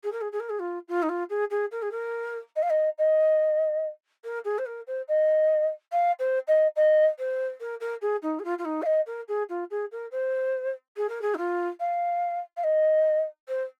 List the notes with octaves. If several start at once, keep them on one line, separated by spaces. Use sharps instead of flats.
G#4
A#4
G#4
G#4
A#4
G#4
F4
F4
D#4
F4
G#4
G#4
A#4
G#4
A#4
D#5
F5
D#5
D#5
A#4
G#4
C5
A#4
C5
D#5
F5
C5
D#5
D#5
C5
A#4
A#4
G#4
D#4
G#4
F4
F4
D#4
F5
D#5
A#4
G#4
F4
G#4
A#4
C5
G#4
A#4
G#4
D#4
F4
F5
F5
D#5
C5